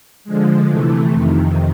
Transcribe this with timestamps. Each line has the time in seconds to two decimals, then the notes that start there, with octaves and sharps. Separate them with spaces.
0.24 D3 F3 G#3
0.68 C3 E3 A3
1.12 F2 C3 D#3